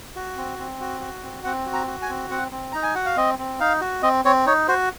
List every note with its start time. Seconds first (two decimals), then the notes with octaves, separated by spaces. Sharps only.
0.16 F#4
0.37 C4
0.59 C4
0.80 F#4
1.01 F#4
1.23 C4
1.44 C4 F#5
1.66 F#4
1.73 A#5
1.87 F#4
2.02 G#5
2.09 C4
2.30 C4 F#5
2.52 C4
2.72 D#4 A#5
2.83 G#5
2.95 F#4 F#5
3.06 F5
3.17 C4 D#5
3.39 C4
3.60 D#4 F5
3.81 F#4
4.03 C4 D#5
4.25 C4 C#5
4.46 D#4 C#5
4.68 F#4 C5